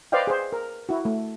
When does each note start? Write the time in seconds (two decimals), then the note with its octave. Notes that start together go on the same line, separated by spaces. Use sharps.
0.12 B4 C5 D5 D#5 F5 G5
0.27 G#4 C5
0.52 A#4
0.89 E4 F#4
1.05 A3